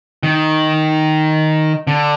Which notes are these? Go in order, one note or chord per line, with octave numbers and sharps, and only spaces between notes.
D#3
D3